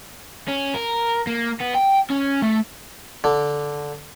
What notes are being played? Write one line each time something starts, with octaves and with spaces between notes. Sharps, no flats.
C#4
A#4
A#3
B3
G5
C#4
A3
D3